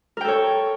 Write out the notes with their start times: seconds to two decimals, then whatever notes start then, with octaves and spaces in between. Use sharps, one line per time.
0.17 A#4
0.21 G5
0.24 A4
0.28 C#5